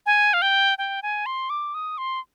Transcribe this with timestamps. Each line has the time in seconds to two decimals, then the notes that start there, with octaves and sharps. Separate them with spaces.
0.06 G#5
0.34 F5
0.42 G5
0.78 G5
1.03 G#5
1.26 C6
1.50 D6
1.74 D#6
1.98 C6